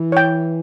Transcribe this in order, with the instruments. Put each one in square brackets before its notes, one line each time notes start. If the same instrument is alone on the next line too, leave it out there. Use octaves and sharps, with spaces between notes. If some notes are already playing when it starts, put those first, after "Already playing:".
Already playing: [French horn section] E3
[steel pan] C#5 G5